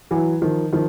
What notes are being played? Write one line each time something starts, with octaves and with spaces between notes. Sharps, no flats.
E3 F#3
D#3 F3
D#3 F3